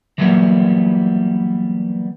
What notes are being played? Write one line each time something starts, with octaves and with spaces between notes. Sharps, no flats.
E3 F#3 G3 A#3 B3